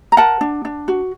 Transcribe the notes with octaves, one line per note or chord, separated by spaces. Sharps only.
A#5
A#4 F#5 A5
D4
D4
F#4